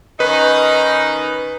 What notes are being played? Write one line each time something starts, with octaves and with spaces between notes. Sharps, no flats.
D#3 C#4 D#4 B4